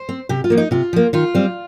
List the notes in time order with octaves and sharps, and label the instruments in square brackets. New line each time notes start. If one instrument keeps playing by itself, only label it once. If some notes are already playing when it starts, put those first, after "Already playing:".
Already playing: [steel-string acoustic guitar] C5
C4
C3 G4
F4
F3 A#3
D#4
C3 F4
F3 A#3
D#3 F4
G3 C4